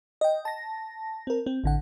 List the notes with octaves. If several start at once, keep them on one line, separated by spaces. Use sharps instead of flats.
D#5 G5
A5 A#6
C4 A#4
C4
A1 D3 F#5